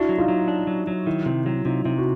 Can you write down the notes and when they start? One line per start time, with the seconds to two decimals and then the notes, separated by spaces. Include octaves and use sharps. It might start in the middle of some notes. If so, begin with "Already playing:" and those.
Already playing: D4 E4 F#4
0.09 F#3
0.18 D#4 F4
0.28 F#3
0.48 D4
0.67 F#3
0.87 F#3
1.06 D#3 E4
1.26 C3 E4
1.46 F#3 E4
1.65 C3 D#4 F4
1.85 C3 E4
1.98 F#4